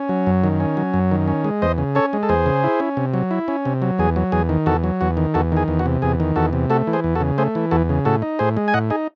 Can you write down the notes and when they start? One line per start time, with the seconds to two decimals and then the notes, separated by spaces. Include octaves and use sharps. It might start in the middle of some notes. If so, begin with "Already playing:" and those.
Already playing: C#4
0.09 F#3
0.27 F#2
0.44 D#3
0.60 C#4
0.77 F#3
0.94 F#2
1.11 D#3
1.28 C#4
1.44 G#3
1.62 E2 C5 D#5
1.78 C#3
1.95 C#4 A4 C#5
2.13 G#3
2.23 A4
2.29 E2 G#4 C5
2.46 C#3
2.64 E4
2.80 C#4
2.97 C3
3.14 F#3
3.31 E4
3.48 C#4
3.65 C3
3.82 F#3
3.99 E2 G#4
4.16 F#3
4.32 E2 G#4
4.49 D#3
4.66 E2 F#4 A4
4.84 F#3
5.01 E2 F#4
5.17 D#3
5.34 E2 F#4 A4
5.52 D#3 G#4
5.68 E2
5.79 F#4
5.86 C3
6.02 E2 G#4
6.20 D#3
6.36 E2 F#4 A4
6.53 C3
6.70 A3 F#4 A4
6.87 E3
6.93 G#4 C5
7.04 E2
7.15 F#4 A4
7.20 C#3
7.38 A3 G#4 C5
7.55 E3
7.71 E2 F#4 A4
7.89 C#3
8.05 A2 F#4 A4
8.22 D#4
8.39 A2 G#4 C5
8.57 G#3
8.68 G#5
8.74 A2 D#5 F#5
8.90 D#4 G#4